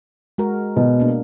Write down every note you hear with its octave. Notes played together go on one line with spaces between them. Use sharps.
G#3 F#4 A#4
B2
A#3 D4